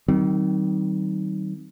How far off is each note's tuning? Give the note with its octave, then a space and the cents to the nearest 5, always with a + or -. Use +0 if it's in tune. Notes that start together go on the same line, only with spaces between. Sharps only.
D#3 +0 G3 -45 C4 +0